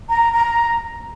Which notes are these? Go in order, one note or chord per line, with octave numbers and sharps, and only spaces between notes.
A#5
A#5